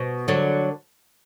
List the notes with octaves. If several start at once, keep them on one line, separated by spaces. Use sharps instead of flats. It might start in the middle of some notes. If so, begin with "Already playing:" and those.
Already playing: B2
D3 F#3